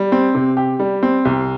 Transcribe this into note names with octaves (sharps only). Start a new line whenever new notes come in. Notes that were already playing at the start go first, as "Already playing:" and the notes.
Already playing: G3
C4
C3
G4
G3
C4
C2